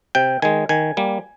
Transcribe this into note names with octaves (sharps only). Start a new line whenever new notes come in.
C3 G5
D#3 G#3 G#5
D#3 G#5
G3 A#3